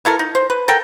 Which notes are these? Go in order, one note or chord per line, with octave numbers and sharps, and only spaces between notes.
E3 E4 A4 A#4
D#4
C5
B4
A4 A#4 F#5 G5